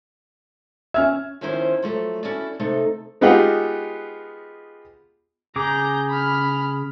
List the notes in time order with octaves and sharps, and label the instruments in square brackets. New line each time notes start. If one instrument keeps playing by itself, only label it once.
[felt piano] C#4 F6 G#6 [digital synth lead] E5
[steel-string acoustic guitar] D#2 D#3 F3 C#4 E4 C5
F3 F#3 A3
C#4 E4 F#4 A4 D5
C3 A3 D#4 A4
[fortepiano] G#3 B3 D#4 F4 G4 F#5
[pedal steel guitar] C#3 G#4 D6 [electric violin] A#5 G6
[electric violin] B5 F6